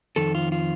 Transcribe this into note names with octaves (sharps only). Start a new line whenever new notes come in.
F2 D#3 A4
F4
F4